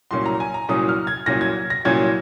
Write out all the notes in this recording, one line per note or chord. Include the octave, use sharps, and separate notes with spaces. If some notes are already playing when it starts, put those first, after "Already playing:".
C2 A#2 F#3 C#4 C6
A#5
G#5
A#5
C2 A#2 F#3 C#4 D#6
F6
G#6
C2 A#2 F#3 C#4 A#6
G#6
A#6
C2 A#2 F#3 C#4 G#6